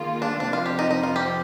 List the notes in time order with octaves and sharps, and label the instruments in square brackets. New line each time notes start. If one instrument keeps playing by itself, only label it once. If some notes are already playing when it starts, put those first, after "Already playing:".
Already playing: [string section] D#3 A#3 F4 G#4
[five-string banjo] D4
[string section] F2 C3 F3 C4 [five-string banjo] D4
[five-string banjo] F4
G4
D#4
D#4
F4
G4